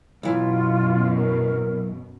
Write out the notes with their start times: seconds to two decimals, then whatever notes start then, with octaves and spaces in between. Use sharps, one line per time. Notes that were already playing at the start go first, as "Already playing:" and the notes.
0.23 B1 F#2 B2 E3 F4
1.16 A#4